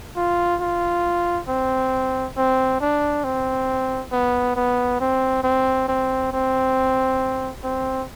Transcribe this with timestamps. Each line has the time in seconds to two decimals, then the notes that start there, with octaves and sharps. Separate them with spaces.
0.16 F4
0.61 F4
1.48 C4
2.37 C4
2.81 D4
3.24 C4
4.12 B3
4.56 B3
5.00 C4
5.44 C4
5.88 C4
6.33 C4
7.63 C4